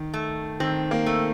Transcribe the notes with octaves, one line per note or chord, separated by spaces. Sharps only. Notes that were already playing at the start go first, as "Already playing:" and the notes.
Already playing: D#3
A3
D#3 C4
A#3
A3